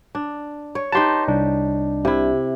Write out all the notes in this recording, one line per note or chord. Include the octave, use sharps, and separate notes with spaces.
D4
C#5
D#4 G4 B4 A5 C6
C2 D4
C3 E4